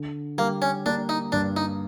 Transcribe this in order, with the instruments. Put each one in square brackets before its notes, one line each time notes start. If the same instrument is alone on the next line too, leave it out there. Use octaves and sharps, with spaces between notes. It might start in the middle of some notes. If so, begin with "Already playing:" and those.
Already playing: [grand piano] D3
[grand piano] G3 [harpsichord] A#3
[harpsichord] C#4
[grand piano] A#3 [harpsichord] D4
[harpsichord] D#4
[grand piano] G2 [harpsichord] D4
[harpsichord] D#4